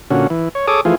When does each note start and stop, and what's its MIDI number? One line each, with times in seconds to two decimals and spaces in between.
0.10 0.27 46
0.10 0.27 50
0.10 0.27 61
0.10 0.27 66
0.30 0.49 52
0.55 0.67 73
0.68 0.81 68
0.68 0.81 69
0.68 0.81 73
0.68 0.81 86
0.68 0.81 87
0.85 0.95 52
0.85 0.95 53
0.85 0.95 57
0.85 0.95 65
0.85 0.95 68